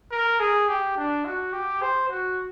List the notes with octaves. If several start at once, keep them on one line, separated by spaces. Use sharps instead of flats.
A#4
G#4
G4
D4
F#4
G4
C5
F#4